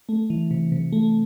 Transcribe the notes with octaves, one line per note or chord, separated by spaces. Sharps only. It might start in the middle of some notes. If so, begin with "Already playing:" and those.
A3
E3
C3
C3
A3